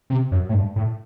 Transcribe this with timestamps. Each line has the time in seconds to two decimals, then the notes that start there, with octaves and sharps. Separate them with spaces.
0.10 C3
0.31 F#2
0.49 A2
0.54 G2
0.76 A2